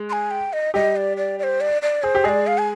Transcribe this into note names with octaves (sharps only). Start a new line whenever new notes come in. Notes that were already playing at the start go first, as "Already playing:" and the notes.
Already playing: G#3
C6
G#5
G5
D#5
G3 G4 D#5
D5
D5
D5
C5
D5
D5
G#4 C5
G4
G#3 G#4 D5 D#5
F5
G#5